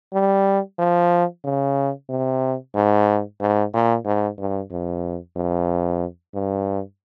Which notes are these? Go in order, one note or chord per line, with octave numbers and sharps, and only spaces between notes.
G3
F3
C#3
C3
G#2
G#2
A#2
G#2
G2
F2
F2
G2